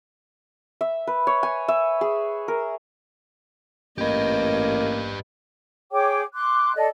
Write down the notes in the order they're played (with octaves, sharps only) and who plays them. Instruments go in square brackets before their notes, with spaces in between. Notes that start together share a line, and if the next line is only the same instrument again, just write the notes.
[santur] E5
B4
C#5
G#5
E5
G#4
A#4
[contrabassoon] A1 [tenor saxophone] A#3 [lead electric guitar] G4 B4 [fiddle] D#5
[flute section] G#4 C#5 G5 D6
C6 D6 F#6
A4 D5 D#5